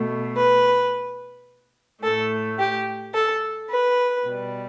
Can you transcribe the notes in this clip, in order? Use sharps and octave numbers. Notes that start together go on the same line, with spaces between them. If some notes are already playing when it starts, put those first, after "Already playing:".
Already playing: B2 A3
B4
A2 A3 A4
G4
A4
B4
B2 G3